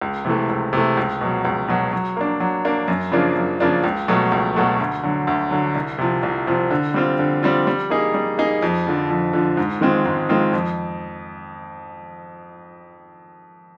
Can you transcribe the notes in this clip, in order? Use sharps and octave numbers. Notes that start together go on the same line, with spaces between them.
C#2
C3 E3 A3
C#2
C3 E3 A3
C#2
B2 F#3
C#2
B2 F#3
F#3
A#3 D4
F#3
A#3 D4
F#2
C#3 F3 A#3 D4
F#2
C#3 F3 A#3 D4
C#2
B2 F#3 A3
C#2
B2 F#3 A3
D2
D3 F#3
D2
D3 F#3
C2
C3 F3
C2
C3 F3
D3
G3 C4 F4
D3
G3 C4 F4
G3
A#3 D#4 G#4
G3
A#3 D#4 G#4
F2
D3 F3
F2
D3 F3
G#2
D#3 G#3 C4 F4
G#2
D#3 G#3 C4 F4
F2